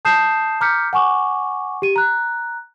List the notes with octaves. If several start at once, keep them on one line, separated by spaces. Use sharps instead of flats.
A5 D#6 G6 C7 E7
A#5 D6 F6 G6 B6 C#7
F#5 G#5 C#6 D6
G4 D#7
A#5 F#6